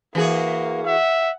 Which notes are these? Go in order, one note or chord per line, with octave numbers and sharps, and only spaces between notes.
E3 A#3 F#4 G#4
E5 F#5